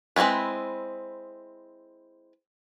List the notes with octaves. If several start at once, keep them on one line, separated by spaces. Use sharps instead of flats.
G#3 C4 C#4 E4 B4